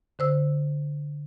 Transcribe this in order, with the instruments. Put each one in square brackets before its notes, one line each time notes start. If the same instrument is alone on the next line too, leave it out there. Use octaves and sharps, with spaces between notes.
[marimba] D3 C5 E6